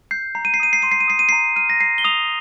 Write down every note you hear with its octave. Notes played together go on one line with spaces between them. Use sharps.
G6 C7
A#5 C7
D#7
C7
D#6 D#7
C7
C6 D#7
C7
D#7
D#6 C7
D#7
A#5 C7
F6 D#7
A#6
A#5 C7
G7
D#6 F7